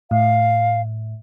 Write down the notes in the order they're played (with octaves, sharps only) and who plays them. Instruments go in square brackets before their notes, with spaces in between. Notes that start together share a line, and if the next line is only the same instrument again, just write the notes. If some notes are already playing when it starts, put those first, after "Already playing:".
[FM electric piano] A2 [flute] F5